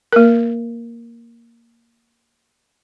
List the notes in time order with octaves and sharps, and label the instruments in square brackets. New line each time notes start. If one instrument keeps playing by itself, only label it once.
[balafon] A#3 A#4